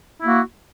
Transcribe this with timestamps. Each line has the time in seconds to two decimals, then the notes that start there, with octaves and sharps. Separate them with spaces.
0.22 E4
0.24 A#3
0.27 F#4